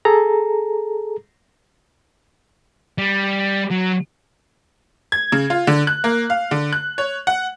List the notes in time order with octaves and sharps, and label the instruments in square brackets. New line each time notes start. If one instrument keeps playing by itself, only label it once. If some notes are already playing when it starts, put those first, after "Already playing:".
[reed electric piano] G#4 A4 A#5
[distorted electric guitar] G3
F#3
[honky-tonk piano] G#6
C#3
F4
D3
F#6
A#3
F5
D3
F#6
C#5
F#5